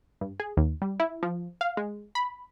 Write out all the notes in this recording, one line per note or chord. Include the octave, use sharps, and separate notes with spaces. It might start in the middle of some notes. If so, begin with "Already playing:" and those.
G2
G#4
D#2
G3
E4
F3
F5
G#3
B5